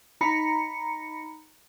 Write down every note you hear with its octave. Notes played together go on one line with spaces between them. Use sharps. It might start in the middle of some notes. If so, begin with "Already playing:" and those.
D#4 A#5 B5 C#7